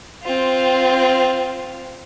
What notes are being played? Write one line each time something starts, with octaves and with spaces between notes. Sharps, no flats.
C4 F4